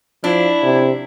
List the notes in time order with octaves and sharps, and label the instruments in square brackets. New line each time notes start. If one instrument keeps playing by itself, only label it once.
[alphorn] F3 [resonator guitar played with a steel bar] D4 [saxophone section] E4
[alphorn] C3